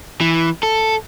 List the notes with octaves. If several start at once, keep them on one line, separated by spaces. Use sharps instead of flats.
E3
A4